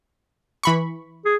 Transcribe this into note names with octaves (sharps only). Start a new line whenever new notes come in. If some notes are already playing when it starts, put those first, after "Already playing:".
E3 B5 C#6
G#4